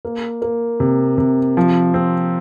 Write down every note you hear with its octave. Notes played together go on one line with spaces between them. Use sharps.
A#3
A#3
C3
C3
F3
C4